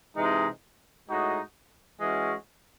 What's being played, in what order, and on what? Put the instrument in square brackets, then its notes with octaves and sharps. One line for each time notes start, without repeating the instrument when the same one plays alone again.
[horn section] C3 E3 G#3 D#4
A2 G#3 D#4 F#4
E3 G#3 C#4 F#4